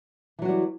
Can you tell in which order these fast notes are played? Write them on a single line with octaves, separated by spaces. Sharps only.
E3 F#3 F#4 G3